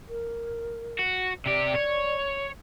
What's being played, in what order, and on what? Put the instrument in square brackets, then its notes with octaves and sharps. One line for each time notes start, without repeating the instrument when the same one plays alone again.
[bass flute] A#4
[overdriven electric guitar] F#4
[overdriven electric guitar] C3 G4 [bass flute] D5
[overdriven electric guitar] C#5